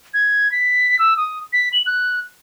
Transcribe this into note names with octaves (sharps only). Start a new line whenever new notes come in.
G#6
B6
E6
D#6
B6
F#7
F#6